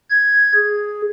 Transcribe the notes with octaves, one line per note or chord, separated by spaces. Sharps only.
G#6
G#4